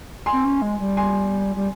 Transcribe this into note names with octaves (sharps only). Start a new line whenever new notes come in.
G#5 C6
C4
C#4
G#3
G3
G#5 C6
G3